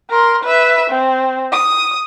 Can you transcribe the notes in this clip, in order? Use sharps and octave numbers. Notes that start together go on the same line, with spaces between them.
A#4 C6
B4 E5
C4
D#6